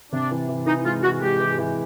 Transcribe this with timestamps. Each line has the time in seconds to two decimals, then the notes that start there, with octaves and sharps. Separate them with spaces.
0.12 C3 D4
0.31 E3
0.48 E3
0.66 E3 D#4
0.85 G#3 F4
1.03 E3 F#4
1.22 G#3 G4
1.39 E3
1.58 E3